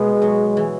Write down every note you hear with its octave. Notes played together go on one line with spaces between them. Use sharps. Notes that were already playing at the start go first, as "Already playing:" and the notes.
Already playing: B2 G#3 B3
F#3
E3